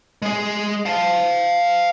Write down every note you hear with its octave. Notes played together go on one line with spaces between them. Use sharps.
G#3 G#4
F5 A5